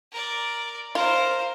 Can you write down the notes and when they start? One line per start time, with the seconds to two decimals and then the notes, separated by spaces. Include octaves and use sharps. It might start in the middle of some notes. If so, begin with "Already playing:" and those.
0.12 A#4 D5
0.95 F4 A#4 C5